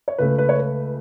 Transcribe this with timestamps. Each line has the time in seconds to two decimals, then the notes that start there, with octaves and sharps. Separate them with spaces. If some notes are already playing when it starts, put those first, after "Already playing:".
0.08 C#5
0.18 C#2 C#3 A3 B4
0.38 B4
0.49 C#5
0.59 B4